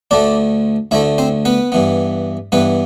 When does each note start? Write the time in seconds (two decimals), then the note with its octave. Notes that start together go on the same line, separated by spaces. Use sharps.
0.11 D2 D3 A3 D4 D5
0.91 D2 D3 A3 E4 E5
1.18 C4 C5
1.45 B3 B4
1.72 G2 E3 B3
2.52 G2 E3 B3 B4